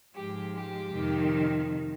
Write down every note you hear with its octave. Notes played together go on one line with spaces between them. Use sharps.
G#2 F3 G#3 G4
G4
F2 C3 D#3